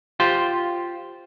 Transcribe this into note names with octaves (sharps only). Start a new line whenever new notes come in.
F4 G4 C5